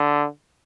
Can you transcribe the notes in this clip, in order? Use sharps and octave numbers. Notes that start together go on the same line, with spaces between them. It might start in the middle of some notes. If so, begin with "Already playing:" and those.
Already playing: D3